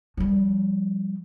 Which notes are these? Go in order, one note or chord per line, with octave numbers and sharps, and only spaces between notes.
F3 G3